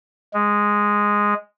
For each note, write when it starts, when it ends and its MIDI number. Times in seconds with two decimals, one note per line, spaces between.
0.34 1.34 56